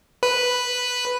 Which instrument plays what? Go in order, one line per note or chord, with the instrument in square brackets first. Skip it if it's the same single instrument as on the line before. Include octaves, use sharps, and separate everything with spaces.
[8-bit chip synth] B4